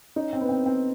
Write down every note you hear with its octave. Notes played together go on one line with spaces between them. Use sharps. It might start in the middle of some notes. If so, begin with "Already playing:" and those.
C#4 D#4
C4
B3
C4
C4